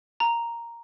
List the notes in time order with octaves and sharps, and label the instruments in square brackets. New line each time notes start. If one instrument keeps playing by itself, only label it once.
[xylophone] A#5